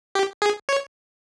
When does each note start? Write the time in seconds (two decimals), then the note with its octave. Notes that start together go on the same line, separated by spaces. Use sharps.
0.15 G4
0.42 G#4
0.69 C#5